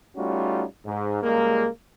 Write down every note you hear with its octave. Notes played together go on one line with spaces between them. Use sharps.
G3 A3 C#4 D#4 F4 F#4
G#2
C#2 G3 G#3 A#3